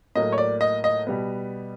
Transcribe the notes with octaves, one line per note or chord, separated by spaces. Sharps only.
A2 F#3 A#3 D#5
C#5
D5
D#5
D#5
B2 G3 B3